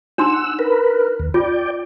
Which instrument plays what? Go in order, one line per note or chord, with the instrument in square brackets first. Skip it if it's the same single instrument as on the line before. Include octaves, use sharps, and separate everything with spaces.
[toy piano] D4 D#4 C6 [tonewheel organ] F#5 E6
[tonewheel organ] A#4 B4
D#2
[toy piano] F4 [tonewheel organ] D5 G5